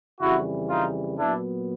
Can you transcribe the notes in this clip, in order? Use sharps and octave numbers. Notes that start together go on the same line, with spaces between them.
F2 C#3 E3 G3 E4 F#4
D#4 F4
A#2 F#3 B3 D4 E4